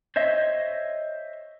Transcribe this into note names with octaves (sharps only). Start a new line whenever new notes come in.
C5 C#5 D#5 E5